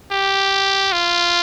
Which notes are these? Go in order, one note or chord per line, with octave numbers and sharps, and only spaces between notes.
G4
F4